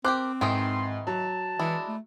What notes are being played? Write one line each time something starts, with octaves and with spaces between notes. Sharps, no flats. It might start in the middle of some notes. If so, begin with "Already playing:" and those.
C4 G4 A#4 C5 D6 F#6
G#2 D#3 E3 D#4 C6
F#3 A5
E3 G#3 D4 E4
A3